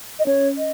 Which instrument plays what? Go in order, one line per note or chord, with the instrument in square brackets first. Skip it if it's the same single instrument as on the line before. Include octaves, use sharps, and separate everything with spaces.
[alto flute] D#5
[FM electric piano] C#4 [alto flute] C#5
[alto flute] D#5